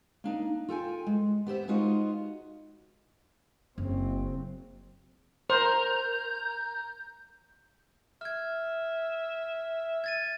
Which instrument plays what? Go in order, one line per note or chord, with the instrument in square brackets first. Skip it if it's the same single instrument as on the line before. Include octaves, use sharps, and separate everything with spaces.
[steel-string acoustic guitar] A#3 D4 D#4
F4 A4 G5 G#5
G#3
B3 G4 C5 E5
G#3 B3 D#4 F4 F#4 D#5
[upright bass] F#1 [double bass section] C#3 F#3 C4
[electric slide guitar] A#4 [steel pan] C5 [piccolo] G6
[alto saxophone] E5 [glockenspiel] F6 G#6
[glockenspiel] G#6 A6 D#7